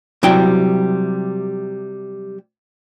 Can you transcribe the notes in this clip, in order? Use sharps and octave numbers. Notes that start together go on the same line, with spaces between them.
C3 F#3 G3 E4 G5